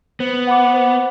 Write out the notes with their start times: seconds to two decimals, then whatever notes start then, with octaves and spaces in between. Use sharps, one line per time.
0.20 B3 C5
0.47 F#5 B5 D6
0.74 C5